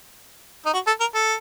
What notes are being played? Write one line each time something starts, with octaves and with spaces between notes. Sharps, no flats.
D#4
F#4
A4
A#4
A4